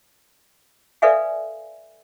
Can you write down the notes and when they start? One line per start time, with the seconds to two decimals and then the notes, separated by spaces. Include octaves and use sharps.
1.02 A4 B4 D5 E5 F5 G#5